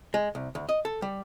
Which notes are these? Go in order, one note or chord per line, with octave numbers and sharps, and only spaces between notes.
G#3
C2
D2
D#5
A4
G3